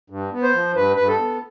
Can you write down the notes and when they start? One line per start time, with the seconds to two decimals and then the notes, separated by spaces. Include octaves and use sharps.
0.10 G2
0.32 B3
0.43 C5
0.54 F3
0.75 G2 B4
0.96 G2 B4
1.08 A4
1.19 B3